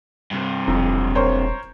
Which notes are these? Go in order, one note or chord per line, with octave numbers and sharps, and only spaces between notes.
G2 C3
E1 F2
A#4 C5 C#5